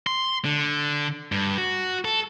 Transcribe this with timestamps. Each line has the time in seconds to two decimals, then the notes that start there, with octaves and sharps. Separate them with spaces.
0.07 C6
0.45 D3
1.32 G2
1.58 F#4
2.05 A4